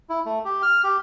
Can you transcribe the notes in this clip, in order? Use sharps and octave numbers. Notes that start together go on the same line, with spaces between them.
E4
A3
G4
F6
G4